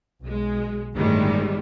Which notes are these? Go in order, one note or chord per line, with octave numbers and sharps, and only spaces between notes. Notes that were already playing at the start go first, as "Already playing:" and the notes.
B1 G#3
G1 A2 D#3 G3 G#3